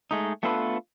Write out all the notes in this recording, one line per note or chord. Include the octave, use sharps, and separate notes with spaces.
G#3 A3 D#4
A3 B3 D4 F4 A4 B4